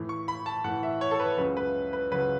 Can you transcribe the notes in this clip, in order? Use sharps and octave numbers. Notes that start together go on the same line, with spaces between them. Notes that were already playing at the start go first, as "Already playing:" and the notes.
Already playing: A2 E3
C#6
B5
A5
A2 E3 F#5
E5
C#5
A4
B4
C#2 C#3 F#3 B4
B4
B4
C#2 C#3 F#3 B4